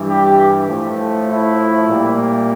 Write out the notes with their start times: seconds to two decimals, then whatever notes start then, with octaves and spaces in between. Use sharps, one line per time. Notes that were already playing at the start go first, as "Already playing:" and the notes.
Already playing: G2 E3 G3
0.09 G4
0.69 A2 F3 A3
1.28 E4
1.88 A#2 G3 A#3